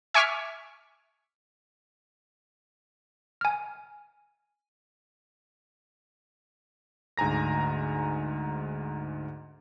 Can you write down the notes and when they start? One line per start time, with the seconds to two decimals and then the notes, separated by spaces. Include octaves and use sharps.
0.14 E5 G#5 C#6 D6 F6 B6
3.41 G#5 F6
7.18 D2 G#2 G#5 A#5 A#6